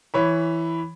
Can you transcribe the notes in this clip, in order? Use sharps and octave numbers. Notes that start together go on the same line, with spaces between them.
E3 C#5 B5